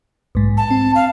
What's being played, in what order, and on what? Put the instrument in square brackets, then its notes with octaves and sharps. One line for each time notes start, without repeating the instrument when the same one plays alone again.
[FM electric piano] B1 G#2
[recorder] A5
[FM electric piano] C4
[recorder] F5